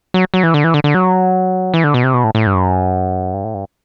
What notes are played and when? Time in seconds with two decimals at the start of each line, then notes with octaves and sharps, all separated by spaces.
0.14 F#3
0.34 F#3
0.43 E3
0.54 D3
0.64 E3
0.74 D3
0.84 D3
0.95 F#3
1.74 E3
1.84 D3
1.94 B2
2.04 C3
2.14 B2
2.24 A2
2.35 A2
2.47 G2
2.55 F#2
3.34 G2
3.44 A2
3.54 G2